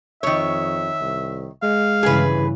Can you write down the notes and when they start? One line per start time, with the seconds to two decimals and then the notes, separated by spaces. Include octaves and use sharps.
0.23 F2 D#3 C#5 E5
1.01 C2
1.63 G#3 F5
2.03 G2 C#3 E3 G#4 B4